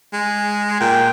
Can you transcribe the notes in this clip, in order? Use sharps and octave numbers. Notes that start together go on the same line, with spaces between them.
G#3
A#2 G5